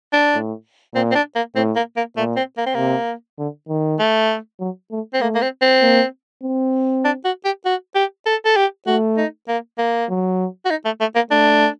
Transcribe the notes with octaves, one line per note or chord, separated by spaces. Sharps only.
D4
A2
A#2 C4
C4
D4
A#3
A2 C4
A#3
A#3
A#2 A3
C4
A#3
C4
C3 A#3
D3
D#3
A3
F#3
A3
C4
A3 A#3
A#3
C4
C4
A#3
C4
D4
F#4
G4
F#4
G4
A4
A4
G4
A3 F#4
D#4
A#3
A#3
F#3
F#4
D#4
A3
A3
A#3
A3 D4